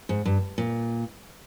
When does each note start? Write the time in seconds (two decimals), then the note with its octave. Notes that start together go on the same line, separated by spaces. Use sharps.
0.09 G#2
0.25 G2
0.58 A#2